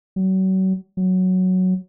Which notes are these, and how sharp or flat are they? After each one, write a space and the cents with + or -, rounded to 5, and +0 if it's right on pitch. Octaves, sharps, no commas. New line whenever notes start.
F#3 +35
F#3 +0